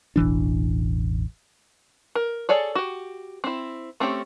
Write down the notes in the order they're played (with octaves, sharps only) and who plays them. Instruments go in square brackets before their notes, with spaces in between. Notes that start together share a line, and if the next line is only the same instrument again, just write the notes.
[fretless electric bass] E1 A1 E3 D4
[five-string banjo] A#4
G#4 A4 C#5 D5
F#4 G4
C4 E4
A3 C4 C#4 G4